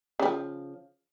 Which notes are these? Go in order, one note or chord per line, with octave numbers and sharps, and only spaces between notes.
C#3 F3 G3